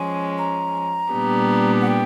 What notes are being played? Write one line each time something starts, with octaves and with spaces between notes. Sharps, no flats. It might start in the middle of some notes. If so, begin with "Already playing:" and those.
Already playing: F3 G#3 C#4 G#5
A#5
A#2 G3 B3 D4 G4
F#5
G5